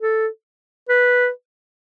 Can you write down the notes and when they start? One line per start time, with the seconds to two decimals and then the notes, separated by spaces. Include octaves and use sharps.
0.01 A4
0.89 B4